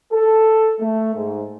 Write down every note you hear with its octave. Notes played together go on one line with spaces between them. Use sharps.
A4
A3
G#2